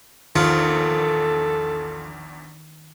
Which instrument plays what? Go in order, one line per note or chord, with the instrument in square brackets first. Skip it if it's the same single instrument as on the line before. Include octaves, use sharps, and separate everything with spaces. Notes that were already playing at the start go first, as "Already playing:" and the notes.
[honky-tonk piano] A#1 E2 [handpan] D#3 [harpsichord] F4 [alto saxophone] A4